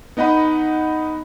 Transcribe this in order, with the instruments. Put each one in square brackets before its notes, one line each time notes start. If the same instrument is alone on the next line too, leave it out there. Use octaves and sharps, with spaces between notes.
[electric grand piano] B3 D#4 D#5 F#5 B5